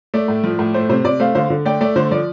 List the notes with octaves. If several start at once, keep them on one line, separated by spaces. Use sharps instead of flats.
A3 D5
A2
F3
A2
A3 C5
C3 C5
C3 D5
A3 C5 F5
D3 C5 F5
D3
A3 D5 G5
A3 D5
D3 C5
F3 D5